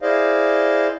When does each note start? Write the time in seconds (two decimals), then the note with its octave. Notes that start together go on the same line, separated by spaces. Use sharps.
0.01 E4 G#4 C5 D5 D#5 F5